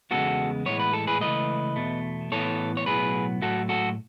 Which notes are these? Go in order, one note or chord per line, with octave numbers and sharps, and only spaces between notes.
E2 C#3 G#3 B3 F#4 A4
A2 E3 G#3 B3 C#5
B4
A4
G#4 B4
C#2 C#3 E3 A3 B4 D#5
E2 B2 A3
A2 E3 B3 A4 C#5
C#5
B1 A2 F#3 B3 G#4 B4
A2 F#3 A3 F#4 A4
F#4 A4